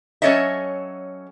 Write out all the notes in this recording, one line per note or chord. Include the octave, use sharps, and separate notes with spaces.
F#3 C#4 A4 C#5 D#5 E5